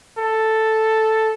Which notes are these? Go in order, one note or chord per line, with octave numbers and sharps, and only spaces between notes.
A4